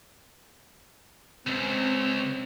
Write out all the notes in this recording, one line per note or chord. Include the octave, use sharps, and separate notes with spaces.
C#2 C4